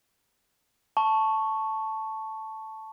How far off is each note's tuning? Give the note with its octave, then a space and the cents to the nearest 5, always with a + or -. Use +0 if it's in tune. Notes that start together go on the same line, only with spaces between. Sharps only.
A5 +0 C#6 +0